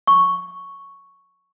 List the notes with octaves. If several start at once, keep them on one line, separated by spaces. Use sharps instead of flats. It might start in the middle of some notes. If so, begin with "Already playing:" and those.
C#6